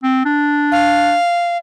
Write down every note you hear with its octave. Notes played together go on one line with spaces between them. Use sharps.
C4
D4
F5